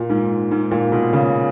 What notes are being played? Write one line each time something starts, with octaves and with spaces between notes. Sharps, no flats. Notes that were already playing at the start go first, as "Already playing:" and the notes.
Already playing: A#2
G#2
G#2
A#2
B2
C#3